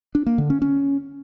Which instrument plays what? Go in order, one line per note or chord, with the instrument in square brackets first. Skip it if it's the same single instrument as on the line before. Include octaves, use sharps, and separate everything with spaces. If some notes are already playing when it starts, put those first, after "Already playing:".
[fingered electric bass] D4
A#3
D3
C#4
C#4